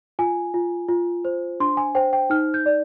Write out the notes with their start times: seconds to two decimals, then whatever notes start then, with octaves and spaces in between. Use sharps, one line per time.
0.19 F4 G#5
0.54 F4
0.89 F4
1.25 C5
1.60 D4 C6
1.77 G#5
1.95 C5 G5
2.13 G5
2.30 D#4 F6
2.54 G6
2.66 D5